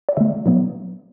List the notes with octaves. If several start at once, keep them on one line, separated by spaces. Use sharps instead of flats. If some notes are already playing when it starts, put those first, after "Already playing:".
D5
D3 A3 E5
B2 F#3 B3